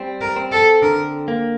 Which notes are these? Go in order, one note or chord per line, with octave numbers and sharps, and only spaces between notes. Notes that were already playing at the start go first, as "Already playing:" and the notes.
Already playing: G3 C4
A#4
C4
A4
D3 A#4
A#3